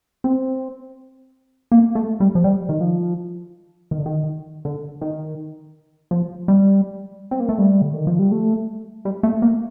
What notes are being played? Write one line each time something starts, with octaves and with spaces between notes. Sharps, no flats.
C4
A#3
A3
G3
F3
G3
D#3
F3
D#3
D3
D#3
D3
D#3
F3
G3
C4
A#3
A3
G3
D3
D#3
F3
G3
A3
G3
A3
A#3